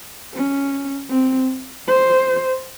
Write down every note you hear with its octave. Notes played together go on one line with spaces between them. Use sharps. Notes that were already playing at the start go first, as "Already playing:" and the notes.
C#4
C4
C5